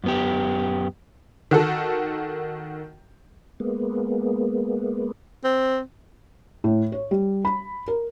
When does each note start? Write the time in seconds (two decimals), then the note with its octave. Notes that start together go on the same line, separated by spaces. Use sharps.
0.04 F#2 B3 G4
1.51 D#3 F#4 A4
3.60 G#3 A#3 B3
5.44 C4
6.64 A2
6.92 C#5
7.11 G3
7.45 B5
7.88 A#4